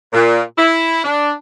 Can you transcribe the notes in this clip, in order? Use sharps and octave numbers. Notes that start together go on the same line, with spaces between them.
A#2
E4
D4